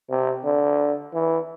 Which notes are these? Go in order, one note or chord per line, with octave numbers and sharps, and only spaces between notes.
C3
D3
E3